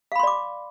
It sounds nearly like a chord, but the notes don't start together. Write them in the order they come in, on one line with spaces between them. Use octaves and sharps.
F5 B5 C6 D5 D6